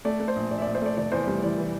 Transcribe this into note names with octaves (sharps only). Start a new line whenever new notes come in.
A3 D5
A3
C5
A#1
A#1 D5
E5
D5
A#1
C5
A3 D5
F1 D5
E2 C5
G3
E3 D5
E3